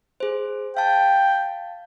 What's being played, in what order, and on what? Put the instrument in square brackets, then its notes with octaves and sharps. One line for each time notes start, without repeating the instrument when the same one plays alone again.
[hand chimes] G#4 C5
[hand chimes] F5 A5 [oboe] G5